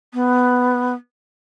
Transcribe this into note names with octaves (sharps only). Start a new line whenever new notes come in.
B3